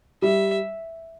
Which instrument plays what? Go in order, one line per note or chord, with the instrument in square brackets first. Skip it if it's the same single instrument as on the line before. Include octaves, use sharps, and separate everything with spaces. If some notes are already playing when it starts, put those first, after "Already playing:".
[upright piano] G3 [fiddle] E5